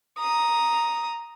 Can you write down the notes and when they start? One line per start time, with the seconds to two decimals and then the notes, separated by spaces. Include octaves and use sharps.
0.19 A#5 D#6